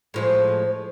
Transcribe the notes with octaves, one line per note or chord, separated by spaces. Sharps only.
A2 F3 G#3